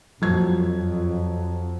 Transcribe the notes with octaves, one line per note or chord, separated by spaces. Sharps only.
F2 F3 F#3 G#6